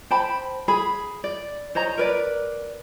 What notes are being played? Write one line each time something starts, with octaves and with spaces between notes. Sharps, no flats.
C5 G5 A5 B5
G#4 B5
D5
C5 C#5 D#5 A#5
A#4 B4 D5